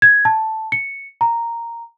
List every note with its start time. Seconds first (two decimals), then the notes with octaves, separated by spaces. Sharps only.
0.02 G#6
0.25 A5
0.72 C#7
1.21 A#5